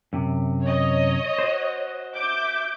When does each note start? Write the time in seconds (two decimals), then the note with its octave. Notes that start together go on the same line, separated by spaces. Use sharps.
0.13 F#2 C3
0.65 C#5 D#5
1.39 F#4 C5
2.13 E5 D6 G6